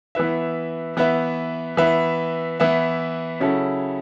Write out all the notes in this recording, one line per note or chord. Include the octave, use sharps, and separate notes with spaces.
E3 B3 E4 B4 E5
E3 B3 E4 B4 E5
E3 B3 E4 B4 E5
E3 B3 E4 B4 E5
C#3 F#3 C#4 E4 A4